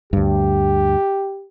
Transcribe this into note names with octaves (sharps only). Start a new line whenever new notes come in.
D2 G2 G4